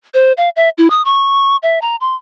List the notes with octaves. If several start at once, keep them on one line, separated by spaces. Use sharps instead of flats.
C5
F5
E5
E4
D#6
C#6
E5
A#5
C6